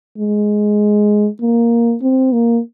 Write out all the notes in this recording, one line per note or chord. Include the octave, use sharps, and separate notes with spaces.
G#3
A#3
C4
A#3